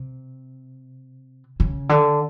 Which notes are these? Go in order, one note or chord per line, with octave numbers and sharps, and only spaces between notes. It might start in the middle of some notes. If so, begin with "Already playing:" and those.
Already playing: C3
C#3
D3